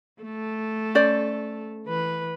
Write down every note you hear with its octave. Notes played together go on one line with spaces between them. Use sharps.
A3 A4
C#4 C5 D5
E3 B4